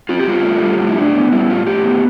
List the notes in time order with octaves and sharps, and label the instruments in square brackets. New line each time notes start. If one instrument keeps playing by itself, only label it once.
[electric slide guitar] C4 F4
G4
G2 F4
A3
G3
A2
E4
A2 D4
B3
G3 E4
A2 F4
A2 G4
B3